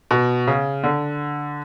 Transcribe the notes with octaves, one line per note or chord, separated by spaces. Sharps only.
B2
C#3
D3